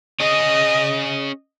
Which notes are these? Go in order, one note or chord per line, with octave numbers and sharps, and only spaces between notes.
C#4 G#4 D#5